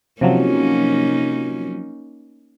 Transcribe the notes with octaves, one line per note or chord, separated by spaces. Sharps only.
C3 F3 F#3 A#3 C#4 D#4